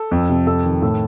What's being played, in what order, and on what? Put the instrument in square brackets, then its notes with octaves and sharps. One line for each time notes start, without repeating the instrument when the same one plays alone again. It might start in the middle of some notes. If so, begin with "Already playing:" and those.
Already playing: [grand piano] A4
F2
C3
F2 A4
D#3
A2 A4